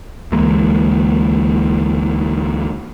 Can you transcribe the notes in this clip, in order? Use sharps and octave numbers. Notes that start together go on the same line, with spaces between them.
D2 E3 G#3 A#3